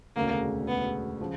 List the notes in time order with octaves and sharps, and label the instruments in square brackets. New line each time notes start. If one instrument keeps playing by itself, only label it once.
[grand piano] E1 D2 C#3 [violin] A#3
[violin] B3
[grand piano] C#3 F3